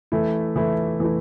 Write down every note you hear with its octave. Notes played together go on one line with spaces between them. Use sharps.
E3 A3 E4
E3 A3 E4
E3 A3 E4